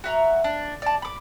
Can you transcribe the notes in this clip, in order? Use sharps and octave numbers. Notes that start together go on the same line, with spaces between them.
F#4 E5 A#5
D4
D5 A5
B5 D6